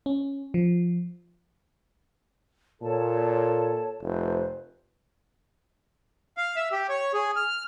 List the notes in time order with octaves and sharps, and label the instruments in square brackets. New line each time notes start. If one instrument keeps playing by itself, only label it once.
[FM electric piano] C#4
F3
[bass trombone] A#2 [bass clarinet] A4 [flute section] C#5 A5
[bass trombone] F1 [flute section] B4 C5
[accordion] F5
E5
G4
C#5
G#4
F6